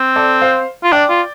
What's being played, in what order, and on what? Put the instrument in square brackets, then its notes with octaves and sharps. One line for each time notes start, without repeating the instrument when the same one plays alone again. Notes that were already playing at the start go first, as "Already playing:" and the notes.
Already playing: [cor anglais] C4
[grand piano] A4 D5
C5 F5
[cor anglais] F4
[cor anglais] D4 [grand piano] D5 G5
[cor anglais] F4